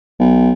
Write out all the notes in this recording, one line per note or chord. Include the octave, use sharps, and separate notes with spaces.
B1